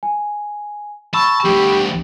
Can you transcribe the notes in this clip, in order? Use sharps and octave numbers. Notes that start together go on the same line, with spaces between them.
G#5
A5 B5 C#6 E6
D2 G3 G4